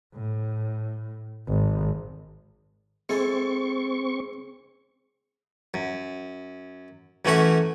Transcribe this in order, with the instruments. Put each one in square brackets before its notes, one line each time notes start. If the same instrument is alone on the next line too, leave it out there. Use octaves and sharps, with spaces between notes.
[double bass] A2
G#1
[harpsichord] G#3 E4 A4 [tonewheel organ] C4 C#6
[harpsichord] F#2
F#2 E3 A3 C#4 F#4 E5